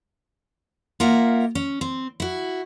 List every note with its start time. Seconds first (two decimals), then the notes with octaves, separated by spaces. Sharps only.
1.00 A#3 F4 A#4 E5 F#5
1.55 C#4
1.81 C4
2.20 E4 F#4